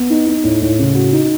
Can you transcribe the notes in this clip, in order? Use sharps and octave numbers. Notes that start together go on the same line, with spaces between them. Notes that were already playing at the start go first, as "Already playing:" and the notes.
Already playing: B3
D#4
D#4
A2
A2
C#3
F#4
D#4